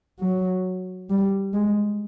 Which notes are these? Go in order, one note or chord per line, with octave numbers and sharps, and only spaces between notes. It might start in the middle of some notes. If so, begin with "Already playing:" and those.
F#3
G3
G#3